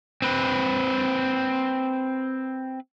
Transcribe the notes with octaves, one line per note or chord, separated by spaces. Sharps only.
C4 B4